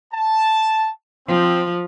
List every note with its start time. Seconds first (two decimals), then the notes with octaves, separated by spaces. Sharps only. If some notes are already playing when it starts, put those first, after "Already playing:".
0.13 A5
1.27 F3 C4